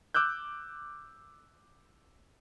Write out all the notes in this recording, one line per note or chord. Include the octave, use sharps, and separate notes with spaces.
D6 E6 F#6 G6